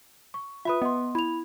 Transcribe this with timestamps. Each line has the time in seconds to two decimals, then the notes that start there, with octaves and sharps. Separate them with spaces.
0.34 C#6
0.65 F4 B4 E5 B5 D#6
0.82 B3 D#5 C6
1.15 E4 B5 F7